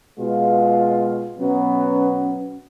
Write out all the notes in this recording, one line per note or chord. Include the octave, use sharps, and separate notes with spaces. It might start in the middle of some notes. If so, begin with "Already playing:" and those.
B2 G#3 F4
B2 F#3 B3 C#4